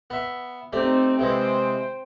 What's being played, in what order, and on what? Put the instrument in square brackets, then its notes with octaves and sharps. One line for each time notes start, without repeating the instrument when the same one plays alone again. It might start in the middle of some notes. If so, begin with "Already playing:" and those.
[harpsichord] B3 E5
[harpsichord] A3 G4 D5 [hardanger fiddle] C4 D#4
[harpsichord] C3 E3 G#3 [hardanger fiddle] C5 G5